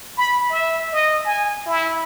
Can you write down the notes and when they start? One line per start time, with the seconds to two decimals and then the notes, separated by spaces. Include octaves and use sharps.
0.18 B5
0.50 E5
0.93 D#5
1.26 G#5
1.66 E4